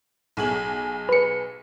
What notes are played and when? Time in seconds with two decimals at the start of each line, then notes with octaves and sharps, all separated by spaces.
0.37 B1 G#4 F#7
1.09 B4 C#7